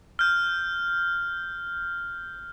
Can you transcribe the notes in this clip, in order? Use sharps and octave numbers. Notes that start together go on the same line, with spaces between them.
F6 G6